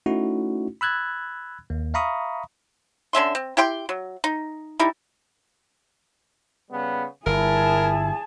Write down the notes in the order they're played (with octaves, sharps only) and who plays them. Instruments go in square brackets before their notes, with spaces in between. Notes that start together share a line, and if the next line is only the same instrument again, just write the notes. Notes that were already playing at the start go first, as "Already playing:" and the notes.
[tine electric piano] A3 C#4 D#4 E4 F#4
B5 E6 F#6 G#6 A6
D#2 A#3
E5 F5 A#5 B5 C#6 D#6
[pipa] D3 C#4 E5 C6
C4
E4 G4 G5 C6
F#3
D#4
G3 D#4 E4
[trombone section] C#3 G3 B3
[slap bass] G1 [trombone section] E4 [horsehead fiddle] G#4 A5 [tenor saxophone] A#4